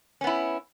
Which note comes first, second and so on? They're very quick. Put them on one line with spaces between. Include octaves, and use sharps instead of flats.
C#4 B3 E4